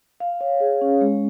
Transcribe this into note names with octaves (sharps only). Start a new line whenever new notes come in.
F5
C#5
G#4
C#4
G#3